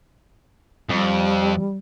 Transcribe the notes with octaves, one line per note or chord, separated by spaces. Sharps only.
F2 G3